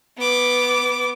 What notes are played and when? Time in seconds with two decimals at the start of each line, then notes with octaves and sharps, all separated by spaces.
0.18 B3 D6